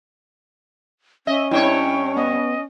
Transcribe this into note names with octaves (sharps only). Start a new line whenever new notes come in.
C#4 D#5 E5
G2 C4 E4 C#5 G5
B3 D#5